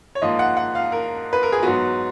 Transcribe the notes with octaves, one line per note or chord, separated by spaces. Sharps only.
C#5
G#2 F3 A#3 D#5
F#5
F#5
F5
A#4
B4
A#4
G#4
G#2 F#3 B3 F#4